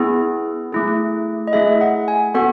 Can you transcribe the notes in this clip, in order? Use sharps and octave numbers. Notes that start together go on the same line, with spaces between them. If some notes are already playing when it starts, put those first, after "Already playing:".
Already playing: B3 E4 G#4
A3 E4 G#4
D#5
A3 E4 G#4 E5
F#5
G#5
B3 F#4 A4 F#5